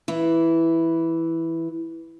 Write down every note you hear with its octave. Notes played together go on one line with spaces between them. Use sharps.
E3 E4